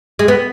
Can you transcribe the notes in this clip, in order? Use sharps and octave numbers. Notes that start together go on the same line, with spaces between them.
G#3
B3